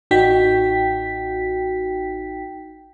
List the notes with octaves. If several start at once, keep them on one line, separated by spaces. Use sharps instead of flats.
A1 D#4 F#4 G5 B6